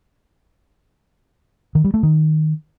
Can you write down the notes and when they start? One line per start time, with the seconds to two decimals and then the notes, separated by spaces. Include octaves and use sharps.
1.75 D#3
1.84 G3
1.94 A3
2.03 D#3